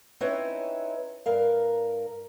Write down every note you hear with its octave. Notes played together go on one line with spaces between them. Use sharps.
C4 C#4 D#4 E4 B4 C#5
G2 A#4 F5